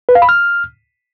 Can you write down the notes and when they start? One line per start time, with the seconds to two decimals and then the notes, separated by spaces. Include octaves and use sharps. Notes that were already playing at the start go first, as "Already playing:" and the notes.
0.09 B4
0.15 F5
0.22 B5
0.29 F6